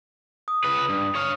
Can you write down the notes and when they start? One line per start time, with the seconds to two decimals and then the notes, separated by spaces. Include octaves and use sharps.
0.48 D#6
0.64 C#2 B4
0.89 G2
1.15 C#5 F5